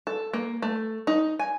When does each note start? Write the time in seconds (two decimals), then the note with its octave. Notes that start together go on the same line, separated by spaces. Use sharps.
0.07 A4
0.33 A#3
0.62 A3
1.07 D#4
1.39 G#5